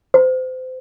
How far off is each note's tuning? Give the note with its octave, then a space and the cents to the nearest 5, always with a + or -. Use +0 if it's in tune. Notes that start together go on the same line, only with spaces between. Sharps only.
C5 -30